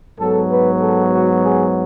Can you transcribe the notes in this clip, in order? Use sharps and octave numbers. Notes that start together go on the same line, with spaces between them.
G#2 F#3 B3 A4
B4
A4
F#4
G#4